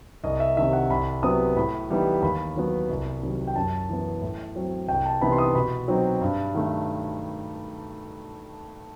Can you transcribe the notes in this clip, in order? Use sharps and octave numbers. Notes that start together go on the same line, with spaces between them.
C2 D#5
E5
C3 D#3 E5
F#5
C2 B5
C3 F#3 B3 D#6
A2 B5
E3 G3 B3 D#4
D#2 B5
D#3 F#3 B3
C2
C3 D#3 F#3
G5
F#2 A5
E3 B3
A2
F#3 C4
C2 G5
A5
C3 E3 B3 D#4 B5
C6
D#6
B2 B5
F#3 C4 D#4
G2
D#3 A3